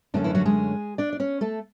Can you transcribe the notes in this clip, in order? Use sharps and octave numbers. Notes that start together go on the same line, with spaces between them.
F#2 D3 A3 C#4 D4
E3 E4
F#3 F#4
G#3 G#4
D4 D5
D5
C#4 C#5
A3 A4